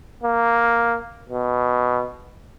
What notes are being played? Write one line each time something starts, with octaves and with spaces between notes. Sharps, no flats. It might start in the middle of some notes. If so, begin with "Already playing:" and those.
A#3
B2